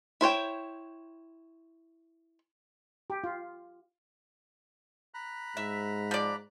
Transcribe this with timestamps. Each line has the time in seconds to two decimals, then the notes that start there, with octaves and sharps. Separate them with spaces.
0.21 E4 C5 C#5 G5
3.10 G4
3.24 F4
5.14 A#5 B5 F#6
5.57 G#2 E5
6.11 F3 D5